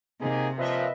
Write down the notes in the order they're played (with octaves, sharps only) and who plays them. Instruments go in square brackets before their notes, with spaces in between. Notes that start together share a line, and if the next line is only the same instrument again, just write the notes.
[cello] C3 [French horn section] A#3 D#4 G#4
[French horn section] A#2 F3 [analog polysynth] B4 D#5 E5